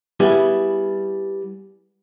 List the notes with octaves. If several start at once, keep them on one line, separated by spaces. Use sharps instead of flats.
G3 B3 E4 G#4